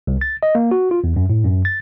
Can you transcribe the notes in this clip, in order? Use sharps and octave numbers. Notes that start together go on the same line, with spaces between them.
C2
A6
D#5
A#3
F#4
F4
E2
F#2
A2
F#2
A6